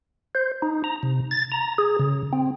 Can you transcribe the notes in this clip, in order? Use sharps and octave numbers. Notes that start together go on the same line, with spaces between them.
C5
D#4
A#5
C3
A6
A#5
G#4
C#3
C4